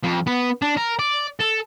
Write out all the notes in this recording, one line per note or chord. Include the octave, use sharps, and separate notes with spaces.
F2
B3
D4
A#4
D5
A4